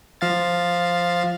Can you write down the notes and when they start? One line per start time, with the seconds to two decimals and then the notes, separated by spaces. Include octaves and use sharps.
0.21 F3 F5 A6